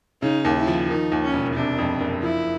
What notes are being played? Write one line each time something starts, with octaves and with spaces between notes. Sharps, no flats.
C#3 D#4
D#2
E4
F3
D#3 D#4
D#2
C#4
E1
C3 D4
F2
F#1
F3 E4